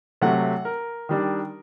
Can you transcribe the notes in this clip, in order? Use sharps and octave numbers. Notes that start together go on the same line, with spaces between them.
C3 F#3 A3 F#5
A#4
D#3 G3 D4